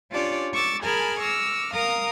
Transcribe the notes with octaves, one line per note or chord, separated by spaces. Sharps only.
C#4 D4 F4 G4 C#5 D5
C#6 D6 E6 A6
G#4 A#4 G#5 A5 B5 F6
C#6 D6 E6 F6 A#6
A#4 F5 A#5 D#6